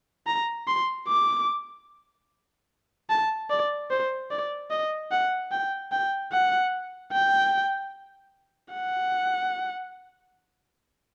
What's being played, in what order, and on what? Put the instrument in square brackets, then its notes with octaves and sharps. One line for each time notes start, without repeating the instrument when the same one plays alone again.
[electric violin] A#5
C6
D6
A5
D5
C5
D5
D#5
F#5
G5
G5
F#5
G5
F#5